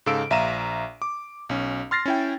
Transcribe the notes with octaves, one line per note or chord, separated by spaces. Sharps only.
G#2 C#3 A4 F5 E6 D7
A#1 E5 F5 A#5 D#7 E7
D6
B1 C#4
C6 F6 A6 A#6 C7
C#4 E4 G5